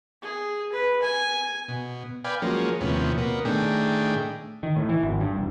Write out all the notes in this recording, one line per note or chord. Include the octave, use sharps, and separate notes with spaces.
G#4
B4
G#5
B2
B4 D5 F5 G5 G#5
F3 F#3 G#3 A#3 C#4
D#2 A2 C3 F3 B3 C#4
B2 A#3 B3
A2 D#3 A3 D4 G#4 G5
D#3
A2
E3
G#1
G2
E1